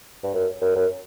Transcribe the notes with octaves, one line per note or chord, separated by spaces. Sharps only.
G2
F#2
F#2
F#2